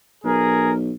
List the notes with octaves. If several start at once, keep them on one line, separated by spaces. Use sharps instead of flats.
B1 G#4 A#4